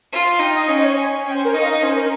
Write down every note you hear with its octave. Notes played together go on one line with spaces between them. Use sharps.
F4
D#4 G5
D#5
C#4 D#5
C5
C#5
G#5
C#4 G5
C5
A#4
D#4 D#5
F5
D#5
C#4 C5
A#4